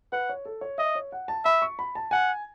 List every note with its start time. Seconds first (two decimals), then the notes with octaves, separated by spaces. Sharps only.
0.12 B4 F#5
0.29 C#5
0.45 A4
0.61 C#5
0.78 D#5 E5
0.95 C#5
1.12 F#5
1.28 A5
1.45 E5 B5
1.62 C#6
1.79 B5
1.95 A5
2.11 F#5 G#5